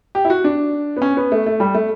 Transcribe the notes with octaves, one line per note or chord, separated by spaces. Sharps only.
G4
E4
F#4
D4
B3
C#4
B3
A3
A3
G3
A3